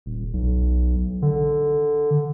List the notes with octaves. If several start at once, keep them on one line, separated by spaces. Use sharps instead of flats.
D#1
B1
D3